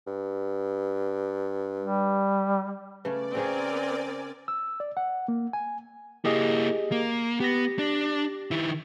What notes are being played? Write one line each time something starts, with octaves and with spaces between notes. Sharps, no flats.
G2
G3
C#3 A3 C#4 B4 D5
C#3 C4 C#4 G#4 A#4 G#5
E6
D5
F#5
A#3
G#5
A#3 E4 G4 G#4 D#5
A#3
B3 G4 A#6
D4
D#3 E4